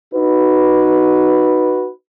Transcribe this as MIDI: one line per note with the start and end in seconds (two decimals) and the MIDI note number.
0.14 1.90 63
0.14 1.90 66
0.14 1.90 71